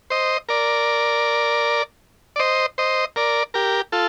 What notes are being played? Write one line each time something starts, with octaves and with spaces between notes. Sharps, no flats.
C5 D#5
A#4 D5
D5
C5 D#5
C5 D#5
A#4 D5
G4 A#4
F4 A4